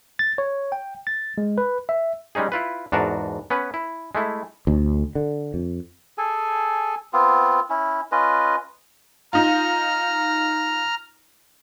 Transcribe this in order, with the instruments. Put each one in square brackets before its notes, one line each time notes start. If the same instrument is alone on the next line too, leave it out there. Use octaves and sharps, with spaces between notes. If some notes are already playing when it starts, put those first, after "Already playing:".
[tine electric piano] A6
C#5
G5
A6
G#3
B4
E5
[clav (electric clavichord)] G3 G#3 C#4 D#4 G#4
E4 F4 B4
E2 G#2 D4 F#4 A#4 A5
B3 C#4 B4
E4
G#3 A3 E4
[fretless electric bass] D2
D3
F2
[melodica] G#4 A4 G#5
B3 C4 F4
C#4 E4
C#4 F4 B4 D#5
[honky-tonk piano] D#4 F4 [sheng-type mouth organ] A#5 F6